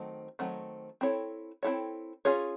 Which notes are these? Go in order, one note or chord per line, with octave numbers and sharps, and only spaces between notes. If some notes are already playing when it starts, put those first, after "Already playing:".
Already playing: D#3 F#3 A3 C4
D#3 F#3 A3 C4
C4 E4 A4 C#5
C4 E4 A4 C#5
C#4 F4 G#4 C#5